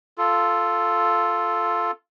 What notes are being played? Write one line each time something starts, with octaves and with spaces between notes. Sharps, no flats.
F4 A4